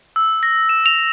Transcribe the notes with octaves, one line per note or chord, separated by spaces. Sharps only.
E6
A#6
E7
F7